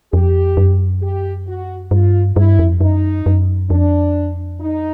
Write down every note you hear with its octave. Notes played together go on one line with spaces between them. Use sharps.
F2 G4
F#2
G4
F#4
G2 F4
G2 E4
F2
F#2 D#4
F#2
F2 D4
D#4